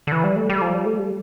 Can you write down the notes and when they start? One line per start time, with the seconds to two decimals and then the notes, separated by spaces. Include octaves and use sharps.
0.07 D3
0.12 E3
0.24 G3
0.36 A3
0.50 G3
0.61 F3
0.74 G3
0.86 A3
0.99 G3